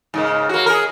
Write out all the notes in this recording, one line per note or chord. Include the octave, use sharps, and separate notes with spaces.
G#2 C#3 A#3
A#3 F#4
G#4 A#4